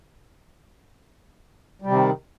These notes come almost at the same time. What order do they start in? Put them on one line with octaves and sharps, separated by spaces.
G3 C3 D#3